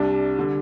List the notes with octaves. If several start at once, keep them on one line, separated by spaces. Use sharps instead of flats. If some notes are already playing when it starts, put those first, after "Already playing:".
Already playing: C2 C3 G3 D4
D3 G3